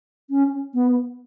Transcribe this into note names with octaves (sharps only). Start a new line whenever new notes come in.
C#4
B3